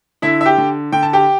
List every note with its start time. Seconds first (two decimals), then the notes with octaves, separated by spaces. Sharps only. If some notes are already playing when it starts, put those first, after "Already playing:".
0.22 D3 E4 E5
0.41 E5
0.45 G4 G5
0.58 D3
0.92 D3 G5
1.03 A5
1.13 G4 G5